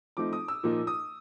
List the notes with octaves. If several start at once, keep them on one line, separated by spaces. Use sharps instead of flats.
F3 A3 C4 D#4 D6
D#6
E6
A#2 F3 A#3 D#4
D#6